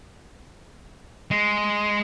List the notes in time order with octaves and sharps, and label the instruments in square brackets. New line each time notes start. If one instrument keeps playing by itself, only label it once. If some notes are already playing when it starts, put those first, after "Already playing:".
[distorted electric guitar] G#3